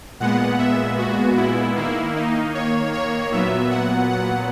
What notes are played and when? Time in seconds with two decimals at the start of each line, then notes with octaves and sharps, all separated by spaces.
0.20 A#2 G#3 B3 F#5
0.59 E5
0.98 F#4
1.37 E4
1.76 D#3 A#3 E4
2.16 D#4
2.55 C#5
2.93 C#5
3.32 A#2 F#3 B3 E5
3.71 F#5
4.09 F#5